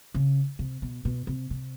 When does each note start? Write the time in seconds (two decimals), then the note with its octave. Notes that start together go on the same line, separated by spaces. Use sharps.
0.15 C#3
0.59 C3
0.82 B2
1.05 B2
1.27 C3
1.51 C3